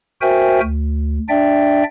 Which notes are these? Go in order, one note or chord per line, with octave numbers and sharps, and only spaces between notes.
F#4 A#4 C5 E5 G5 G#5
D2
D4 D5 E5 G5